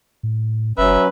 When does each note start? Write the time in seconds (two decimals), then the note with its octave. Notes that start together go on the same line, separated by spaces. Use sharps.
0.23 A2
0.78 F#1 F#3 C#4 B4 E5